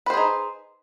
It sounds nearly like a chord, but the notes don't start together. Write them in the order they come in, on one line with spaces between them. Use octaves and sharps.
B4 C5 G#4 D#4